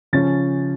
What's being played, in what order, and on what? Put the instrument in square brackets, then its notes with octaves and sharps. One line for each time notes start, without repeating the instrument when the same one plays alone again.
[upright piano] C#3 F3 C#4 A6